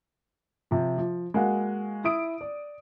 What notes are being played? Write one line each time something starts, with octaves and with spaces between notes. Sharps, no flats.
C3 F3
F3
G#3 A#3 F#4 F5 F#5
E4 D#6 D7
D5